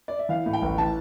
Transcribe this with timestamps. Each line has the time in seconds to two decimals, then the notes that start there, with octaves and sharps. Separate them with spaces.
0.08 D5
0.19 E5
0.29 E3 F5
0.46 A2
0.53 G5
0.62 A1
0.78 E3 A5